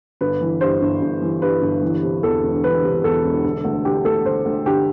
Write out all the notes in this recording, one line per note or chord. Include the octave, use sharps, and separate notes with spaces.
G1 B4
E3
G2 C5
G1
G1
E3
G2 B4
G1
E3
C3
E2 A4
E1
E3 B4
C3
E2 A4
E1
D3
D2
D3 G4
D2 A4
D3 C5
D2
D3 G4